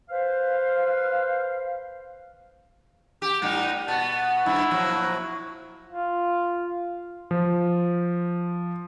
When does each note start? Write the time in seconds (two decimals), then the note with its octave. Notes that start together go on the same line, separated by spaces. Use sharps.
0.10 B4 C5 F5
3.22 G4 D6
3.42 A2 G3 D#4 F#5
3.88 B2 B3 A5
4.46 G2 E4
4.71 A#2 F3 F#3
5.88 F4
7.31 F3